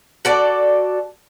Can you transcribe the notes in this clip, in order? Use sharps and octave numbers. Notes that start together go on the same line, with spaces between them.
F#4 A4 D5